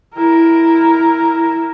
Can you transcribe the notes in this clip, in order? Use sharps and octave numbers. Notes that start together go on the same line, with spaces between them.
E4 A#4